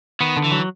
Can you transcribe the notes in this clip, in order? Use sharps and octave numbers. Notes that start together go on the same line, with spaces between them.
D#3 B3
D3
E3
F#3